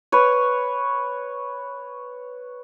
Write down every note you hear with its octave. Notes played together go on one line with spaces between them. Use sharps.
B4 C#5